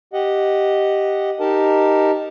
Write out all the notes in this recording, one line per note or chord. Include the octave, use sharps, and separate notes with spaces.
G4 D#5 F#5
D#4 G4 A#4 A5